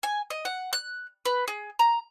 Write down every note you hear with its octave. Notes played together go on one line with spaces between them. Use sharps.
G#5
D#5
F#5
F#6
B4
G#4
A#5